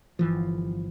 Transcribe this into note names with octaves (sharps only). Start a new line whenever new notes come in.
G1 E3 F3